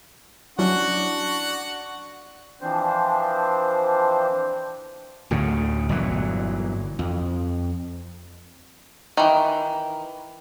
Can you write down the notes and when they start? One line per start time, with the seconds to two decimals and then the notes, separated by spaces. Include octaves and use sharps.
0.59 F#3 C#4 D4 E4 F#4 F#5
2.61 E3 F3 C4 D4 C5
5.31 D2 A2 C#3
5.89 G1 A#2 E3 F#3
6.99 F2
9.17 D#3 E3